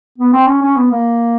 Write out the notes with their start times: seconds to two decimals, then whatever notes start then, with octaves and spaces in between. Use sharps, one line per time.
0.18 B3
0.33 C4
0.47 C#4
0.62 C#4
0.77 B3
0.91 A#3